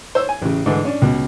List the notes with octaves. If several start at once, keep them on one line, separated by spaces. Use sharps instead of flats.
C5 C#5 E6
G#5
A1 C#3
G#2 D3 E3
C#4 D4
C#2 B2